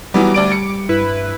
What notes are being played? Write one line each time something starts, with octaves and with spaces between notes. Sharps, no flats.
E3 F#3 G3 B3 D6
D2 D5 D7
C#7
G2 E4 B4